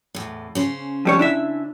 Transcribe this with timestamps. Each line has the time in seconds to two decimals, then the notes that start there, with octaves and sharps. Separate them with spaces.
0.15 E2 A2
0.55 C#3 C#4 C5
1.05 F2 G3 C#5
1.19 D4 E4 E5